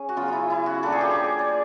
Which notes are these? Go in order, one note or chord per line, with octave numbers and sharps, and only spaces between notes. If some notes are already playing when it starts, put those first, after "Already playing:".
Already playing: C#4 G#4
F#4
C#3 F#3 B3 F4
E4 F4
E4
F#4
F3 A#3 D4 A4
G#4
G4
G#4
D5